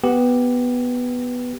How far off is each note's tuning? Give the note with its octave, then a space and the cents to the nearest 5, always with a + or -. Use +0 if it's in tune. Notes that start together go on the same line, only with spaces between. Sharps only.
B3 +0 G4 +0